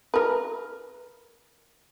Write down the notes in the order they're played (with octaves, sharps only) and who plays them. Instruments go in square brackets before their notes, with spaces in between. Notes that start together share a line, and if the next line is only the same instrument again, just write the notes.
[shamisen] A#4 B4